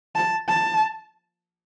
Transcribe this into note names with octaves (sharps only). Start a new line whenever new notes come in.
A5
A5